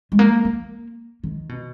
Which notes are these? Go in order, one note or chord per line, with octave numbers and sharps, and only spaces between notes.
G#3
A#3
A#3
D#3
B2